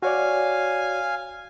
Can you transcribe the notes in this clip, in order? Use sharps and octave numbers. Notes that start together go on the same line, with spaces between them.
F#4 C#5 D5 F5 G#5